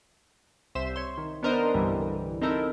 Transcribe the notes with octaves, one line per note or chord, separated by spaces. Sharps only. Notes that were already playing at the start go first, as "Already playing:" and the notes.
C2 C5 E5 E7
C#5 C6
D#3
B3 D4 A#4 C5 D#5
C2 G2 D3 E3 G3
C4 D#4 E4 A4 A#4